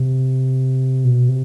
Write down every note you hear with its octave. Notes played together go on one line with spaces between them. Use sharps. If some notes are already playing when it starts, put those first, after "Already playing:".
Already playing: C3
B2
C3